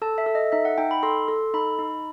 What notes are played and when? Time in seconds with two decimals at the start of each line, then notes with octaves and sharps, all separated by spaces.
0.02 A4 A5
0.18 E5
0.26 A4
0.35 D#5
0.52 D#4 E5
0.65 F#5
0.78 D#4 G5
0.91 B5
1.03 A4 C6
1.28 A4
1.54 D#4 B5
1.79 D#4